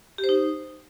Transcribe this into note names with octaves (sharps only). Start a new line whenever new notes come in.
G4
C5
D#4